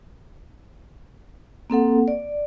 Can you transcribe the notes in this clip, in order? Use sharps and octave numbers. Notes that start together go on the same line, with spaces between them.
A#3 C4 A4 F#5
D5